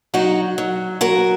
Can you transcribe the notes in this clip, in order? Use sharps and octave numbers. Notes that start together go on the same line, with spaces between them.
F#3 D#4 F#4
F#3
F#3 F#4 A#4